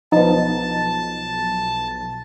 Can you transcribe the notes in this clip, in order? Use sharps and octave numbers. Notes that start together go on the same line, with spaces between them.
B1 F3 B3 D#4 A5